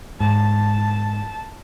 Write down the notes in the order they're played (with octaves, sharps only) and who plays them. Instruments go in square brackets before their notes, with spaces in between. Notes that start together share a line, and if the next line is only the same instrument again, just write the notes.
[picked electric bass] G#2 [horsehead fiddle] A5